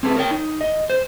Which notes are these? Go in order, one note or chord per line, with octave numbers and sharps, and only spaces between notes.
C4 G#4 A4 B4
A#4 C#5 G5
D#4
D#5
C5